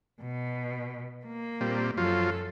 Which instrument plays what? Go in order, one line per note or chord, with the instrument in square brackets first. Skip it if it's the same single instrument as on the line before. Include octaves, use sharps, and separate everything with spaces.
[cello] B2
A#3
[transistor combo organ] A#2 G3 C4
[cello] F#2 A4 [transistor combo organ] F3 F#3 F4